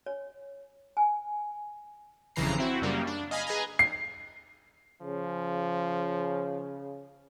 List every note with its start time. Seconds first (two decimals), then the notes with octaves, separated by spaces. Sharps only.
0.06 C#5
0.97 G#5
2.36 G1 F2 C#3 E3 A#5 C7
2.58 C4 E4 F#4
2.82 F#2 C#3 G3 A#3
3.07 D4
3.31 D#5 F5 G#5 B5
3.47 G#4 B4 D#5 G#5 A#5
3.79 C7
5.02 C#3 F3